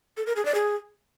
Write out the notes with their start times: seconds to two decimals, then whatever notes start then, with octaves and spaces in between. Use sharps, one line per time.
0.17 A4
0.27 A#4
0.36 G#4
0.45 D5
0.55 G#4